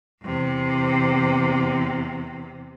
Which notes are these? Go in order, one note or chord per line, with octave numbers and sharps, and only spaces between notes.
E2 C3